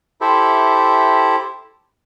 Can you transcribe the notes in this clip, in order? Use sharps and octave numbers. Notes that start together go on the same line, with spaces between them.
E4 G4 A4 C5 E5